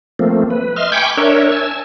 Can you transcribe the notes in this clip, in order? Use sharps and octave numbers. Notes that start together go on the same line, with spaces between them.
F3 A3 A#3 C4
B4
D#5 E5 C6 F6
G5 G#5 B5 C#6 D6 G6
D4 A#4 C#5 E5
G#5 A5 E6